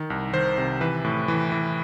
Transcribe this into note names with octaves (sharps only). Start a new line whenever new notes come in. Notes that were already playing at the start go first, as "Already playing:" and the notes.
Already playing: D#3
C2
D#3 C5
C3
E3 B4
A2
E3
E3